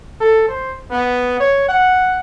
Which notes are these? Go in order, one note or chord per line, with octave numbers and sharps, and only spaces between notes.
A4
C5
B3
C#5
F#5